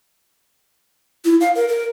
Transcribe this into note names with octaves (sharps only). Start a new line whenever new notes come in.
E4
F5
A#4
A#4